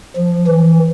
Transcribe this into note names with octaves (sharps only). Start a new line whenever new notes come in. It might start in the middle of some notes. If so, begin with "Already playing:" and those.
F3
E3